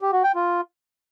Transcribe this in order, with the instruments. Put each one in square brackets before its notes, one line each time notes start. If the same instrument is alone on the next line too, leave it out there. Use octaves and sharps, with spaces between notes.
[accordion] G4
F#4
G5
F4